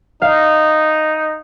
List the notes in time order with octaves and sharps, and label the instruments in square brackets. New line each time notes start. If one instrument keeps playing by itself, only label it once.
[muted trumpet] D#4 [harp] F5